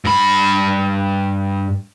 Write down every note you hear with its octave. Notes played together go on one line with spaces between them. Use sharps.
G2 B5